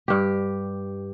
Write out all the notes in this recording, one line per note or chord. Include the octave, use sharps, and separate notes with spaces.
G2 G4